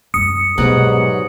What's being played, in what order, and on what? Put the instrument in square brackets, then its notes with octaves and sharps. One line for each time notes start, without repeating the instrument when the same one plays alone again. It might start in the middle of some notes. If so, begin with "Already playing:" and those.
[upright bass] F#2 G3 [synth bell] D#6 C#7
[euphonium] G#2 [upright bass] B2 [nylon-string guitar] F#3 G3 B3